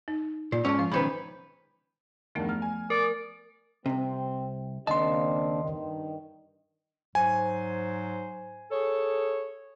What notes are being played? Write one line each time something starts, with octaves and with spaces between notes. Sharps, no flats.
D#4
A#2 F4
G#2 G#3 C#4 A5
F3 F5
B1 D#3 C#4 B4 C5 B5
E2 G2 D#3 F3 A3 B3
A#5 F6
G#5
A#4 D5
C2 C3 C4
D#2 C#3 A#3 C4 D4 D#5 A5 C6
G2 D#3
G#2 F#3 C5 G#5
G#4 A4 C#5